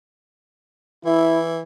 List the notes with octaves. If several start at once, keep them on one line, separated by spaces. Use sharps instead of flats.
E3 E4